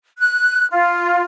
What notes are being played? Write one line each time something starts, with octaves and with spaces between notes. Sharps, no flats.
F#6
F4